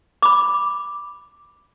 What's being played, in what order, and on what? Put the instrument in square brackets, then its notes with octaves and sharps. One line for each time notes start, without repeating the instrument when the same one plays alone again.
[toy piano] B5 D6